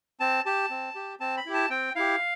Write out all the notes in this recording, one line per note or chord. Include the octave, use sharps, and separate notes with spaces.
C4 A5
G4 A5
C4
G4
C4 A5
B5
E4 G4
A5
C4 G5
E4 G4 F5